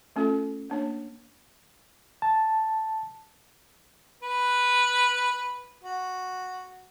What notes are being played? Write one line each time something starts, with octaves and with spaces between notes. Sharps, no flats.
A3 C#4 F4 A4
A#3 D4 C#5
A5
B4
F#4